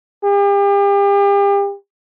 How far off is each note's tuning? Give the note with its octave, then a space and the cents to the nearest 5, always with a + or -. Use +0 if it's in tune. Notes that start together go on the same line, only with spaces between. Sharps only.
G4 +40